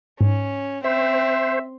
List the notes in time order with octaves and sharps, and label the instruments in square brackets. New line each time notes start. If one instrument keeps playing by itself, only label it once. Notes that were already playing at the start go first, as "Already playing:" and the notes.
[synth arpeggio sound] G#2 [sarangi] C#4
[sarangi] C4 [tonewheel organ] C5 [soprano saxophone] E5